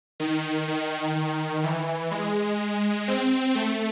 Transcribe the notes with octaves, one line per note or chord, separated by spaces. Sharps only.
D#3
D#3
D#3
E3
G#3
C4
A3